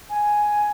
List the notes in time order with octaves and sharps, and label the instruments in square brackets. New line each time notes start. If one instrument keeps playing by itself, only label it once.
[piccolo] G#5